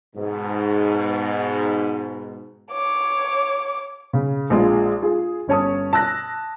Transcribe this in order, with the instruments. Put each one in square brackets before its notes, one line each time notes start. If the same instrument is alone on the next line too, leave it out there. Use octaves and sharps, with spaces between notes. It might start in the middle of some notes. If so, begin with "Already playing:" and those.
[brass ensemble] G#2 B2
[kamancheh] C#5 D6
[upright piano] C#3
A#1 G#3 F4
F4 G#4
G1 C#4 C#5 A5 D#6
A5 E6 F#6 A#6